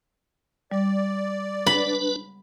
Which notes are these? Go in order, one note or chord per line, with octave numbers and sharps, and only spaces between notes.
G3 D5
D4 B4 B5